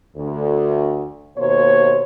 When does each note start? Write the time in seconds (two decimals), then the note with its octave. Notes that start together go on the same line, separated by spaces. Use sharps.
0.16 D2
1.37 D#2 B2 A#3 C5 C#5